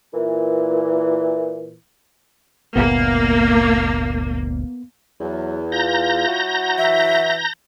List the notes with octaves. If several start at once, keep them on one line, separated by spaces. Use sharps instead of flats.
A#2 E3
G1 D2 A#2 A#3 B3
E2 F#3
F4 A#5 G6 A#6
F#3 E4 F#4
E3 E5